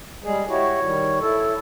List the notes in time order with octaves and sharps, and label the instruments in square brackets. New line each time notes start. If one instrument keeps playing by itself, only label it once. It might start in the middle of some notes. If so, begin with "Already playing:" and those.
[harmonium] G3 G#3 G#4
[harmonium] E4 F#4 G4 [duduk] C#5
[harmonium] D#3 G3
[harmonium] E4 [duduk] A4